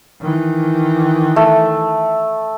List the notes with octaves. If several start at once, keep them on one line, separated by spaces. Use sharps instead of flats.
D#3 E3
A3